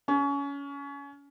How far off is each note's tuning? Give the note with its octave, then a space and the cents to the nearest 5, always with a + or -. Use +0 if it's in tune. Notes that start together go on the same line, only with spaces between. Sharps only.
C#4 +25